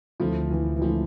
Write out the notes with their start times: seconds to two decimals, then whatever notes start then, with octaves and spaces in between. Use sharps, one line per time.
0.20 D2 D3 F3 A3 C4 E4
0.50 E3
0.76 E3
0.81 D3 F3 A3 C4 E4